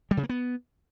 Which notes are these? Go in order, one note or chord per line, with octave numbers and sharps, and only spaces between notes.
G3
C#3
A#3
B3